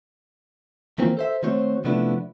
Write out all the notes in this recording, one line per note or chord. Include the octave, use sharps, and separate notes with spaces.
D#3 E3 A#3 C4 F4 A#4
A4 C5 E5
D#3 A3 C4 F#4 C5 C#5
C3 F3 A3 B3 D4 E4